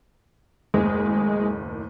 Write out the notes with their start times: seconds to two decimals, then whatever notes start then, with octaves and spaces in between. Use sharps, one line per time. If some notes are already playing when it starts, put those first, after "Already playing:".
0.74 F#1 D#2 A2 G#3